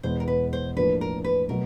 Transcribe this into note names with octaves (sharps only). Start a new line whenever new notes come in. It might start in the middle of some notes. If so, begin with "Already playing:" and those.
E2 B2 G#3 B3 C5
A#4
B4
C5
A2 F3 A#3 D4 B4
A#4
B4
B2 F#3 A3 A#4